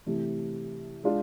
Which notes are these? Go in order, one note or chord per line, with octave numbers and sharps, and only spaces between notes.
C3 E3 A3
G#3 D4 F4